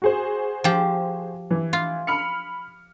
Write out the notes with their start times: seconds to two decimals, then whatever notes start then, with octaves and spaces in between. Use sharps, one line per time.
0.02 F#4 G#4 C5
0.64 F3 G4
1.51 E3
1.73 F4
2.07 B5 F6 C#7